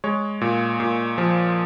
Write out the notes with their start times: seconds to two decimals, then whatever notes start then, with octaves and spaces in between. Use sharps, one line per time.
0.04 G#3 C#5
0.41 A#2
0.80 A#2
1.18 F3